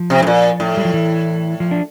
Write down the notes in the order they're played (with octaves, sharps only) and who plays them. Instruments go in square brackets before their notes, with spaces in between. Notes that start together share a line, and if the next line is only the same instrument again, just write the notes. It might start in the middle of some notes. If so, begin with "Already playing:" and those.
Already playing: [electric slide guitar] F3
[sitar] C3
A2
A#2
A2
[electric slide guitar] G3
F3
E3
F3
D4